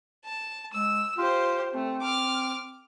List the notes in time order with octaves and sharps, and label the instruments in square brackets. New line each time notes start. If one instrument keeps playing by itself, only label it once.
[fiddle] A5
[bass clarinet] G#3 [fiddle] E6
[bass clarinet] F4 [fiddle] G4 C5
[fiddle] A3 [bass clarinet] C4
[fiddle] D6 F6